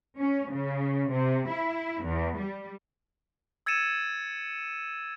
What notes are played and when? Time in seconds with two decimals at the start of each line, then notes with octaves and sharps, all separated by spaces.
0.18 C#4
0.50 C#3
1.11 C3
1.50 E4
2.04 E2
2.40 G3
3.66 E6 G#6 A6 C#7 D#7 E7